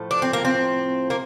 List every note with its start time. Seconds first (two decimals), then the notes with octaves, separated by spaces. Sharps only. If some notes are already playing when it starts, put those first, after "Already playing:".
Already playing: A2 F3 A3
0.11 D4
0.22 C4
0.33 A#3
0.45 C4
1.10 A#3